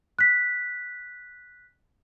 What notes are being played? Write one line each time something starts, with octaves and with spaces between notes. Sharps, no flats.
F#6 B6